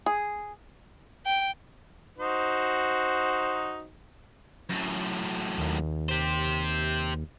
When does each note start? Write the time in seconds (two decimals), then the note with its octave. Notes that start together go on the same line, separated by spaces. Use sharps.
0.06 G#4
1.26 G5
2.18 D#4 F#4 C5
4.69 F#2 A2
5.58 D#2
6.09 G4 C5